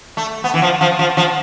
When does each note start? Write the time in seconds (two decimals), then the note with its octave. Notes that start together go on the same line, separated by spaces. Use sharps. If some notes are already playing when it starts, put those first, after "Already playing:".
0.17 A3
0.44 B3
0.54 E3
0.62 F3
0.81 F3
0.99 F3
1.17 F3